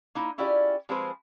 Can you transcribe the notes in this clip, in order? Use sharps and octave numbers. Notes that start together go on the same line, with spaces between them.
A#3 D#4 E4
C#4 E4 F4 G4 G#4 D5
F3 G#3 C4 G#4 B4 C5